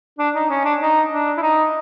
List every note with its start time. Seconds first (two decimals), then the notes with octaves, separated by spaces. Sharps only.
0.19 D4
0.35 D#4
0.50 C#4
0.65 D4
0.81 D#4
1.10 D4
1.38 E4
1.42 D#4